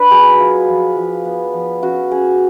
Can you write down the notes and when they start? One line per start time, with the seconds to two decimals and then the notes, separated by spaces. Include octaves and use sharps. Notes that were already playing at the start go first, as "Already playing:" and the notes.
Already playing: D4 B4
0.11 F#3 G#4
0.40 F4
0.69 F3
0.97 F3
1.25 B3
1.53 F3
1.82 C#4 F#4
2.11 C#4 G#4